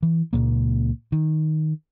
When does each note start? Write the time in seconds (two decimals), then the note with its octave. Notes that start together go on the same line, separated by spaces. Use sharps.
0.03 E3
0.33 C#2 G2 A#2 A#3
1.12 D#3